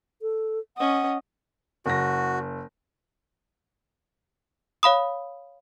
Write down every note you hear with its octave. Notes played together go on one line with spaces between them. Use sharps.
A4
C#4 D#5 F#5
F#1 F#4 A#6
C#5 F5 B5 D#6